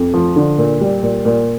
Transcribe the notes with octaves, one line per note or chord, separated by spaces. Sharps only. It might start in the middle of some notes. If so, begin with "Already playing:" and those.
Already playing: F2
F3
D3
A#2
G3
A#2
A#2